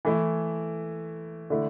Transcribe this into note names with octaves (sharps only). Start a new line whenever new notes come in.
E3 A3 E4
D3 A3 E4